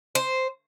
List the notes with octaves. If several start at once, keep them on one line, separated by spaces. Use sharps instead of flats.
C5